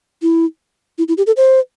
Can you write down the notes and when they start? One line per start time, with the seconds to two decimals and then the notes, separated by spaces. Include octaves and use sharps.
0.22 E4
0.98 E4
1.08 E4
1.18 G4
1.27 A4
1.37 C5